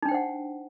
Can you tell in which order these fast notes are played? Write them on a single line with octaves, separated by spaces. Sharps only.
D#4 D4 G5 C5 F#5